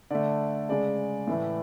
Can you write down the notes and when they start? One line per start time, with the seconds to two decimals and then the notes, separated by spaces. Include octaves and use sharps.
0.11 D3 A3 D5
0.69 C#3 G#3 D5
1.27 A2 E3 A3